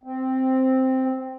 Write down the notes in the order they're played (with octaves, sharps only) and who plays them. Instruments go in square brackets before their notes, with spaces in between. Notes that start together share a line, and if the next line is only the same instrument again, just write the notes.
[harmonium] C4